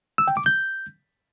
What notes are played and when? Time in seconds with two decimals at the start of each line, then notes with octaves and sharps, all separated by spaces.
0.18 E6
0.28 G5
0.37 D6
0.46 G6